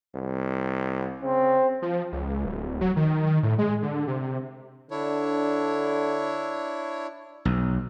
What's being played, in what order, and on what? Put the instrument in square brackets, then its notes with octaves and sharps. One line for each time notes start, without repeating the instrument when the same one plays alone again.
[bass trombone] C2
[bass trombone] C#3 [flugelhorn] C4
[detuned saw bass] F3
C#2
D1
F#3
D#3
D#3
A2
G#3
D3
C3
[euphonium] D3 [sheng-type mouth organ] D4 E4 C#5
[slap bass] B1